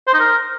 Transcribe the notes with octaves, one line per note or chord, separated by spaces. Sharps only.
C5
D#4
A#4